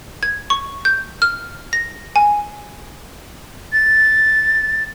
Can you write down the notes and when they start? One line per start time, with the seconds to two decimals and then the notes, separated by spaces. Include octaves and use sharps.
0.23 G#6
0.50 C#6
0.85 G6
1.22 F6
1.73 A#6
2.16 G#5
3.73 A6